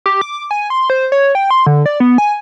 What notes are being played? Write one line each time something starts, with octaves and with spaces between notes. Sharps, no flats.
G4
D6
G#5
C6
C5
C#5
G5
C6
D3
D5
B3
G#5